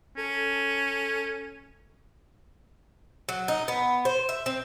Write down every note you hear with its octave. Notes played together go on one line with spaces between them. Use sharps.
C#4 A4
F#3
D#4
B3
C5
E5
C4